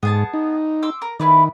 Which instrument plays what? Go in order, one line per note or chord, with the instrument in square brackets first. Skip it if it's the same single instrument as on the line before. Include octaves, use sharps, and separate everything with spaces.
[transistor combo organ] G#2 [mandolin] B3 G#4 A5
[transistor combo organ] D#4
[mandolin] C6 D6 E6
A#4
[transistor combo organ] D#3 [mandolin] E4 B4 D5